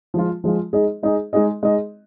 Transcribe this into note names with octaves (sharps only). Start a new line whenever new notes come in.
F3 G#3 F4
F3 G#3 F4
G#3 D#4 G#4 D#5
G#3 D#4 G#4 D#5
G#3 D#4 G#4 D#5
G#3 D#4 G#4 D#5